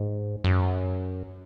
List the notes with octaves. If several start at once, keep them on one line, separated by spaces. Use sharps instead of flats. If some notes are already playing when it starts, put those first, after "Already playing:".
Already playing: G#2
F#2